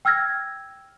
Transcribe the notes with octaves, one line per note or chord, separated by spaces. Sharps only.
G5 E6 F6 G#6 A#6